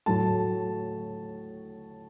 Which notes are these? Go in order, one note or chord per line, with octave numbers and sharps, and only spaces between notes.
A2 F#3 A3 A5